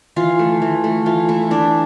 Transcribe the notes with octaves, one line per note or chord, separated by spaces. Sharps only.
E3 F4
A3
E3
A3
E3 F4
A3 E4
E3 D4